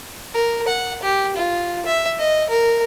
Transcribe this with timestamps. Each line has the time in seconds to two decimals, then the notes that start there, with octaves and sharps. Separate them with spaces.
0.34 A#4
0.67 F#5
1.02 G4
1.36 F4
1.86 E5
2.19 D#5
2.49 A#4